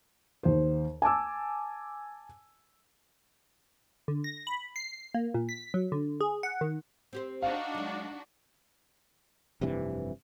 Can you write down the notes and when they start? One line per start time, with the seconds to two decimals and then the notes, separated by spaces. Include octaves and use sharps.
0.43 D#2 C5
1.02 G#5 A5 D6 E6
4.08 D3
4.24 A#6
4.47 B5
4.76 C7
5.14 A#3
5.34 A#2
5.49 B6
5.74 F#3
5.92 D3
6.21 G#4
6.43 F#5
6.61 D#3
7.13 C4 G4 C5
7.42 D4 D#4 F#4 F5
7.74 F#3 G#3
9.61 F1 G2 C3 E3